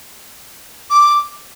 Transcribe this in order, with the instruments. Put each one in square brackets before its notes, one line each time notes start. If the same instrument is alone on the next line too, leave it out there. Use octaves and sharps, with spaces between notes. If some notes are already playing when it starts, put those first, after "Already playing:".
[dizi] D6